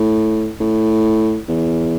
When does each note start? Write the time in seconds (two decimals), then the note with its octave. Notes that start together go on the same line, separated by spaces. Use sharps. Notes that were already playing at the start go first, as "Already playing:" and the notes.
Already playing: A2
0.60 A2
1.48 E2